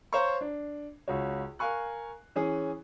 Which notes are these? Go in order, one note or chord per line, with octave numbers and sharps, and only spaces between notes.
C5 C#5 F5 A#5 C#6
D4
C#2 F#4 C#5
A#4 F5 G#5 C#6 F#6
E3 C#4 G#4